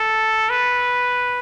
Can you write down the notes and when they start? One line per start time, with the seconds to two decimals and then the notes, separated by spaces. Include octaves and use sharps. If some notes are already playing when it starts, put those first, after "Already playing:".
Already playing: A4
0.50 B4